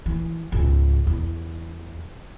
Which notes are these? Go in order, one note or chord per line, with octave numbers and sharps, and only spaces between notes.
E3
C#2 G#2
E2